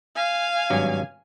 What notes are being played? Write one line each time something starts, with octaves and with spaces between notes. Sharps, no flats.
F5 G#5
G#1 G2 F#3